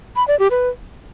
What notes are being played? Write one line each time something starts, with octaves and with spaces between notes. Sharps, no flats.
B5
D5
G4
B4